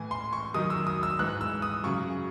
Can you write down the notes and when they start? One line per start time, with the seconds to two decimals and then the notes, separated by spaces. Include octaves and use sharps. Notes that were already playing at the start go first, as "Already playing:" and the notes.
Already playing: A2 E3 G#5
0.11 C6
0.33 C#6
0.54 F#2 D#3 F#3 D#6
0.70 E6
0.87 D#6
1.03 E6
1.19 G#2 E3 F#6
1.41 E6
1.62 D#6
1.84 F#2 C#3 F#3 C#6